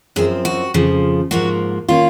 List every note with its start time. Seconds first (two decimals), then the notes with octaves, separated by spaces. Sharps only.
0.16 F#2 F3 C4 G#4
0.45 F#4
0.74 F2 C#3 F3
1.31 G#2 F3 A#3 F#4
1.89 D#3 A#3 C#4 F4